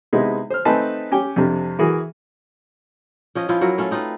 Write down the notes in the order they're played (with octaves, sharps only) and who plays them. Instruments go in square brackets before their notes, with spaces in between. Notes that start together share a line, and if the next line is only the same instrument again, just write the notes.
[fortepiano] C3 G#3 B3 D#4 E4
C5 F6
A3 C4 D#4 B4 G#5 A5
C#4 G4 G5
F2 C3 D4
E3 E4 F#4 G#4 A#4
[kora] F3 C#4 D#5
F3 E4 F4
F#3 E4 A#4
A3 C#4 F4
C4 D#4 F4 B4